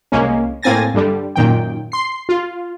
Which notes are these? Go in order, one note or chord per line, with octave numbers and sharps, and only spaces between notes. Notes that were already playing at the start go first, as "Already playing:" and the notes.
C2 G#3 A#3 C#4
A2 A#3 C4 G#5 A6 A#6
G2 D3 G3
F#2 A#2 D#3 G5
C6 C7
F4